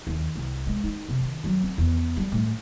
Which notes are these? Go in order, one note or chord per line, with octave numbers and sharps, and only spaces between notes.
D#2
C2
G#3
D#4
C3
D#3
F#3
C4
E2
G3
A2